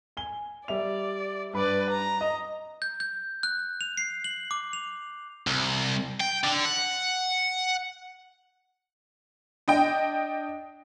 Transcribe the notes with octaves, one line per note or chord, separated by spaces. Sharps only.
G#5 G7
G3 D5 E5 F7
G2 B4 D5 B5
A#5
D#5
G6
G6
F#6
F7
C7
F#7
D6
F7
C2
G5
D3
F#5
D4 D#5 G5